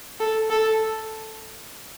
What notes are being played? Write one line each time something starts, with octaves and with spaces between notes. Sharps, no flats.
A4
A4